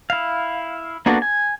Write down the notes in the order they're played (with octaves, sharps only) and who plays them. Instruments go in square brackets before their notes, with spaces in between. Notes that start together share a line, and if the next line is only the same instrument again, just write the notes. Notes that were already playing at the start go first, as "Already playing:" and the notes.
[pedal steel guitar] E4 F5
A#3 B3 D4 F#4 A4
G#5